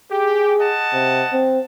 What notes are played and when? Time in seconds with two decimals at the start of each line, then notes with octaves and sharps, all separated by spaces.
0.12 G4 G#4
0.59 D#5 F#5 A5
0.93 C3
1.33 C4